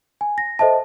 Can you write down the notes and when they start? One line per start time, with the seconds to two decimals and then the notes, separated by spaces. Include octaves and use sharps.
0.21 G#5
0.38 A#6
0.59 A4 C5 D#5 E5 A5